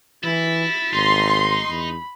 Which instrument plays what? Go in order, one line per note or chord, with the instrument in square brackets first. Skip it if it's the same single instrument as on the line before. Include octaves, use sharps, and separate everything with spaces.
[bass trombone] E3 [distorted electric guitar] E4 [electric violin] A6 B6
[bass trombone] G#1 [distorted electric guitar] D#4 [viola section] C6
[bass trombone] E2 [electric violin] B5